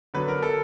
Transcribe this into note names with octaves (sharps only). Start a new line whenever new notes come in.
D3 F#3 B3 B4
A#4
A4